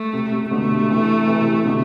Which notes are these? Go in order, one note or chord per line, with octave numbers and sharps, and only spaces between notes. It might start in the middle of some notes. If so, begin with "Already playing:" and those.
Already playing: A3
C3
C3
B2 D3 A3
C3 E3
C3 E3
C3
C3
B2 D3